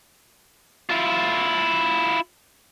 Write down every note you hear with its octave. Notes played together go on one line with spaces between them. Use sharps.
E4 F4